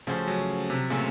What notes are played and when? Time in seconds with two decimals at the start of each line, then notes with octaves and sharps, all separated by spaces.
0.07 C#3 F3 A3 C#4 F#4 C5
0.28 F#3
0.70 C3
0.90 A#2 C#3 A3 C#4 F#4 C5